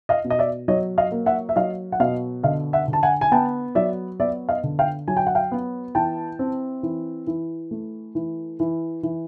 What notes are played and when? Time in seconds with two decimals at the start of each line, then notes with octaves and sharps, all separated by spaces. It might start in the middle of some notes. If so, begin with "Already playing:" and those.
0.09 D#5 F5
0.25 B2
0.30 D#5
0.39 D5 E5
0.68 F#3 C#5 D#5
0.98 D#5 F5
1.12 A#3
1.26 E5 F#5
1.49 E5
1.56 F#3 D#5 F5
1.92 F#5
2.00 B2 D#5 F5
2.43 D3 D#5 F5
2.73 E5 F#5
2.88 D3
2.93 A5
3.03 F#5 G#5
3.21 G#5
3.32 B3 G5 A5
3.75 F#3 D5 E5
4.20 B3 D5 E5
4.49 D#5 F5
4.64 D3
4.79 F5 G5
5.08 F#3 G#5
5.17 G5
5.27 F#5
5.35 F5 G5
5.51 B3
5.95 E3 G5 A5
6.39 C4
6.83 E3
7.27 E3
7.71 A3
8.15 E3
8.60 E3
9.03 E3